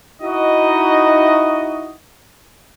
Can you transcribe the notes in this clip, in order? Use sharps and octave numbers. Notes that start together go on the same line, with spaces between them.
D#4 E4 F#4 D#5